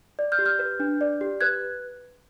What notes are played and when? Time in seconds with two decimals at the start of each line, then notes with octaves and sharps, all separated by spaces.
0.19 D5
0.32 F6 G6
0.39 G4
0.45 F6 G6
0.59 B4
0.80 D4
1.01 D5
1.21 G4
1.41 B4 F#6 G#6